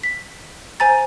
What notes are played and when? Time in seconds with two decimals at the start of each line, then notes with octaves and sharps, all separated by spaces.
0.03 B6
0.80 C5 G#5 A#5 A6